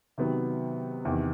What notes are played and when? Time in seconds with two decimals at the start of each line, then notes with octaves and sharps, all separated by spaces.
0.18 C3 D#3 F#3 B3
1.05 E2 C3 D#3